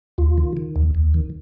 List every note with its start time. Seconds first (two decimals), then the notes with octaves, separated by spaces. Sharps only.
0.18 D#2 F4
0.38 D#3
0.57 D#3
0.76 D#2
0.95 D#2
1.14 D#3